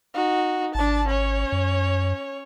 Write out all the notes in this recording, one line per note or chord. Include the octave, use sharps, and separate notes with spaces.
D#4 F#4
G#1 D4 A5
C#4 C#5
F#2